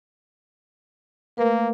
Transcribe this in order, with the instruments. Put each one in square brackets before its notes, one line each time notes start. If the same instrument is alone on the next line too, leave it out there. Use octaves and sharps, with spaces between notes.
[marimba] A3 A#4 B4 [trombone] A#3